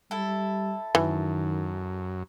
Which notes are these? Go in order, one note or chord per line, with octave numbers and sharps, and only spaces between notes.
G3 E4 A4
F#2 D#3 E3